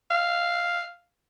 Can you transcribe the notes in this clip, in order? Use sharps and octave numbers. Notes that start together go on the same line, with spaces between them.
F5